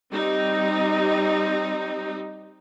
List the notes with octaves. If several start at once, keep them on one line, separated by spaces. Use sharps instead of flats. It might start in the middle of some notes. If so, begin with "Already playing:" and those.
G3 C4 D#4